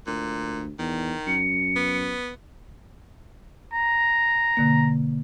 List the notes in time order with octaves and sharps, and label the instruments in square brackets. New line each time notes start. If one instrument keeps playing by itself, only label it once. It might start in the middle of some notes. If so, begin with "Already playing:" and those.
[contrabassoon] D2 [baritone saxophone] A#2
[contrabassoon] E2 [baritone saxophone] D#3
[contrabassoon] F#2 [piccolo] C#7
[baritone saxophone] B3
[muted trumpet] A#5
[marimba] B2 D3 A#3